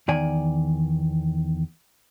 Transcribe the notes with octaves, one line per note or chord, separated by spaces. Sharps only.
E2 D#3 D5 G#5